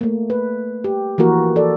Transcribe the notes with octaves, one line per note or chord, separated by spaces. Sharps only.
A3 A#3
B4
G4
E3 F3 A#3 F#4 A#4
A4 D5